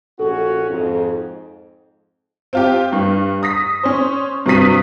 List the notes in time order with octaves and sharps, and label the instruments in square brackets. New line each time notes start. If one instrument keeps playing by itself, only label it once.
[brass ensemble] A#1 C#4 F#4 [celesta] A4
[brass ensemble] F2 G#2
[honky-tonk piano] C4 F4 G4
G2
D#6 A#6 B6
C#4 C5
G2 C3 F#3 D#6 B6 D#7